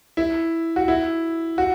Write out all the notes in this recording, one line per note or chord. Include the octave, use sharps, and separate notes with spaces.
E4
F#4
E4
F#4